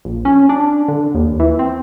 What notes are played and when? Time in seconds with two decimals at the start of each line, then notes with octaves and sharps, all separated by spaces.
0.05 A#1
0.25 C#4
0.49 D4
0.88 D3
1.15 D#2
1.40 E3
1.59 C4